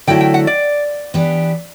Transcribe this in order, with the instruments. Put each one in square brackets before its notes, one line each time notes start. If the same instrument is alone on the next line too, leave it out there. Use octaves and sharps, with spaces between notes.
[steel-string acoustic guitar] D3 F#3 A3 E4 [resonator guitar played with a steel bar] G5
[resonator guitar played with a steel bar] G5
F#5
D5
[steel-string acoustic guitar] E3 B3 D4 G4